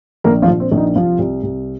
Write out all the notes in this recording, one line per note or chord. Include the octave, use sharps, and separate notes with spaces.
A#1 A#3 A#4
F3 F4
A#1
C4
A#1
D#4
C2 F3 F4
C2
C2